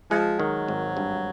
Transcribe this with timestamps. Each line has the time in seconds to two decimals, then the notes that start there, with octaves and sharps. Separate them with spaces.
0.11 F3 G#3
0.40 D#3 F#3
0.68 G#1
0.97 G2